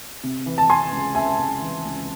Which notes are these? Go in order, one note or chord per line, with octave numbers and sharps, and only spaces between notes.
C3
E3
A5
C3 G#5 C6
C#2
C#2 E5 G#5
C#2
E3
C#2